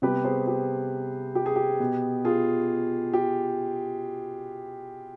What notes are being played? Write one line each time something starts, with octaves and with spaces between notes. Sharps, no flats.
C3 G3 B3 G4 B4
G#4 C5
G4
G4
G#4
G4
B2 B3
F4 G#4
G4